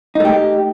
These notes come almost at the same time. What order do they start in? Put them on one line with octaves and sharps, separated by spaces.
D#4 A3 G4